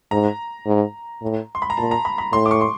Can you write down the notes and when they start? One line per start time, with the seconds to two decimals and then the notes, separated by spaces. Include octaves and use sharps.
0.11 G#2 A#5
0.66 G#2
1.22 A2
1.55 C6
1.62 B5
1.70 A#5
1.77 A#2 A5
1.91 A#5
2.05 B5
2.18 B5
2.32 A2 C6
2.46 D6
2.51 C#6
2.61 C6